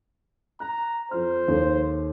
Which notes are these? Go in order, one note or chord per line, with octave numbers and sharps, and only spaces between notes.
A#5 F#6
F2 C5 F6
D#2 A4